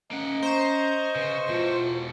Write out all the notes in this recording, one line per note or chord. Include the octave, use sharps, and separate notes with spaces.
A#3 C#4 D#5 F#5
C5 A#5 C#6
C#3 B4
E2 B2 F4